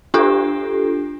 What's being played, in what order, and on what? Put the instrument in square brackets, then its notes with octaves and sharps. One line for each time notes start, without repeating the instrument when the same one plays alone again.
[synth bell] D4 F4 G4 A4